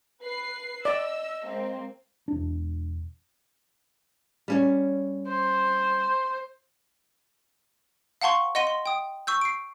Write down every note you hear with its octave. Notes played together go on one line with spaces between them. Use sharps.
B4 C7
D5 D#5 E6
G#3 A#3 C4
E1 D4
G3 C#4 C#5
C5
F5 F#5 A5 C6 C#6
D#5 F#5 C6 A#6 D#7 G7
C6
G5 D#6
C#6 E6 G6
C7 D7